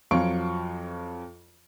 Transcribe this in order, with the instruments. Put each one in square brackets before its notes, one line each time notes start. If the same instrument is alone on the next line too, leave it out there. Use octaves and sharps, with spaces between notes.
[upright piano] F2 F3 F#3 F4 C#6 D7